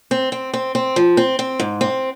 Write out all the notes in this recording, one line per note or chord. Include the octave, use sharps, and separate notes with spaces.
C4
C4
C4
C4
F3
C4
C4
G#2
C4